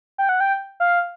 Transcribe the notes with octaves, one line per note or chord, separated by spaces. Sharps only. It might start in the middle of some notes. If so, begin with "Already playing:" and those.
G5
F#5
G5
F5